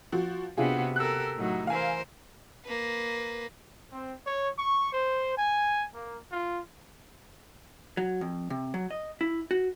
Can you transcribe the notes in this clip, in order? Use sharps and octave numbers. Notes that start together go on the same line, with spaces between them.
F3 F#4
C3 B3 D4 F4 F#4 G#4
G4 A4 A#4 E6 F#6
A2 F#3 D#4
E3 A#4 C5 F5 G#5
A#3 B4
C4
C#5
C#6
C5
G#5
A#3
F4
F#3
F2
C3
F#3
D#5
E4
F#4